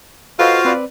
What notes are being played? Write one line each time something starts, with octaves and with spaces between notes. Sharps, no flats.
F4 F#4 A4 B4 C5 D#5 F5
C4 B4 D5